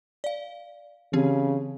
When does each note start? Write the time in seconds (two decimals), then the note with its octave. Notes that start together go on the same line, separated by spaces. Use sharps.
0.24 D5 F5
1.13 C#3 E3 C4 G4